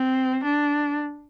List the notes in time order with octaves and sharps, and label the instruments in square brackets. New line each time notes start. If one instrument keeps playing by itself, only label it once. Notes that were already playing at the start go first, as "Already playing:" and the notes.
Already playing: [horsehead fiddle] C4
D4